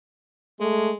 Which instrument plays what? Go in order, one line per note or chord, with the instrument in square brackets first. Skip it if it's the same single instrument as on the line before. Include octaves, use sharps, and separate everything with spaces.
[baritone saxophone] G#3 [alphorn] A3